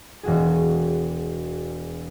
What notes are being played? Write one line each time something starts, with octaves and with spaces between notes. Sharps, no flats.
E1 F#4 G#4